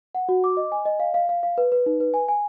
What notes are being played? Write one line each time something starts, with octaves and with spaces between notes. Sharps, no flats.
F#5
F#4
D6
D#5
G#5
D#5
F5
F5
F5
F5
B4
B4
D#4
B4
G#5
G#5